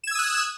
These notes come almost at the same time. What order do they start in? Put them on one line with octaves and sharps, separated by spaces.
E7 G#6 E6 D#6 F#6